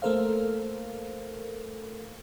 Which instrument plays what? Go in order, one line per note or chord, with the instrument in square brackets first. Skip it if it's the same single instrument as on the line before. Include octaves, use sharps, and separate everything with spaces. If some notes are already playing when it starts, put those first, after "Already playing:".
[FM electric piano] A3 A#3 A4 A#4 C5 F5